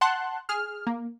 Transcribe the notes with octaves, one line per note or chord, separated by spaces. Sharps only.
F#5 A5 C6 F#6
G#4 F6
A#3